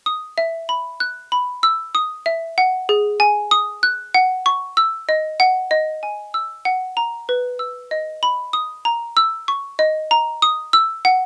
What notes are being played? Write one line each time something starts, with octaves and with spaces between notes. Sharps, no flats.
D#6
E5
B5
F#6
B5
E6
D#6
E5
F#5
G#4
G#5
D#6
F#6
F#5
C#6
E6
D#5
F#5
D#5
G#5
E6
F#5
A#5
B4
E6
D#5
B5
D#6
A#5
E6
C#6
D#5
A#5
D#6
E6
F#5